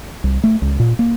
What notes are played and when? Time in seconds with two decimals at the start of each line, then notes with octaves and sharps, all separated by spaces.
0.24 C2
0.44 A3
0.62 C#2
0.80 A#2
0.99 A#3